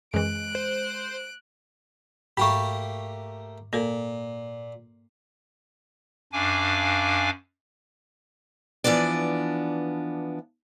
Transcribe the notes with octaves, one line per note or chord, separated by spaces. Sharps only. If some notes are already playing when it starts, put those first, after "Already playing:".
F#2 E3 G#3 F#6 D7
C5
G#2 A3 A#3 G4 B5 C#6
A#2 A#3 A4 A#4
F#2 D4 F5 G#5 D6
E3 F3 B3 D4 D5